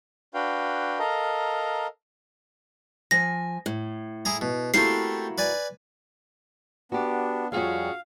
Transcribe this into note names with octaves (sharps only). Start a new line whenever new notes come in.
D4 F#4 B4 F5 G5
A4 A#4 D#5 F5 A#5
F3 G#5 A#6
A2
E4 G#4 A#5
B2
A3 A#3 C4 E4 F#4 G4 C7
B4 D5 G#5
B3 D4 F#4 G4
F2 G3 C#4 F4 F#4 G#4 F5